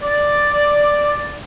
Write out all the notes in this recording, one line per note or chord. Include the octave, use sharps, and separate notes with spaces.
D5